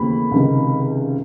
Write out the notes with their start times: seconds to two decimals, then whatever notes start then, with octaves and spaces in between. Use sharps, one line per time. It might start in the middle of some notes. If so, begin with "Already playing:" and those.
Already playing: D#2 C#3 E3 A3 C4 B5
0.32 C#2 C3 D#3